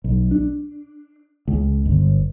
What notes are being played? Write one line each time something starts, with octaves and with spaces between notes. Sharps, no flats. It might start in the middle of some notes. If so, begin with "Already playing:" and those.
B1
D4
C#2
G1